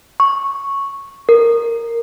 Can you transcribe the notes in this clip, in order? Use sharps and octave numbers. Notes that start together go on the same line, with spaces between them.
C#6
A#4